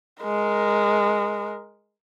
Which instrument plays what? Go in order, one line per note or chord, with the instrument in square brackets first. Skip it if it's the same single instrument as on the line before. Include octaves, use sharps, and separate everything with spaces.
[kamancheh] G#3 A#4